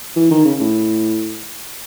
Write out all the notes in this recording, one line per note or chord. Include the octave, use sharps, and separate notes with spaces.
E3
D#3
C#3
A2